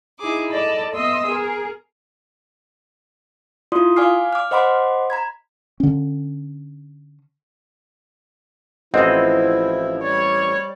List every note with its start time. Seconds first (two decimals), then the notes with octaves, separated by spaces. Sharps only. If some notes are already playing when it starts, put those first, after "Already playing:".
0.19 D#4 E4 G#4 D6
0.50 A4 D5 D#5 A5 B5
0.93 B3 D#5 E5 C6 D#6 E6
1.27 G#4 A#4
3.72 E4 F4 D5 C6 D#6
3.96 D5 F5 G#5 D6 F6 C7
4.33 D6 F6
4.51 C5 D#5 F#5 B5 C6 D6
5.10 A#5 B5 G#6
5.80 D3 C#4
8.94 A1 F3 C4 E4 C5 D#5 F#5
10.03 G3 C#5 D5